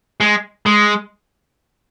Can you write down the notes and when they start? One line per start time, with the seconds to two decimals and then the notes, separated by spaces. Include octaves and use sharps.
0.20 G#3
0.66 G#3